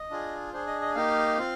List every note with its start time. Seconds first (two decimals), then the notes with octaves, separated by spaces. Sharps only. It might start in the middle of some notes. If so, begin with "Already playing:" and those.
Already playing: D#5
0.10 D4 F4 G#4
0.53 D4 G#4 C5
0.67 D#5
0.81 D#5
0.95 A#3 D#4 G4 F5
1.37 C4 F4